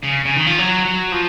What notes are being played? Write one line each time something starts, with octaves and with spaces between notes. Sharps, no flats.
C#3
C#3
D#3
F3
F#3
F#3
F3